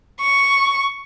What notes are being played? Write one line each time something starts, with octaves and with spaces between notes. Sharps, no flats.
C#6